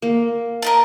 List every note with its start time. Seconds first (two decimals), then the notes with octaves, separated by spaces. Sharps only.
0.02 A#3
0.62 A#4 D#5 A5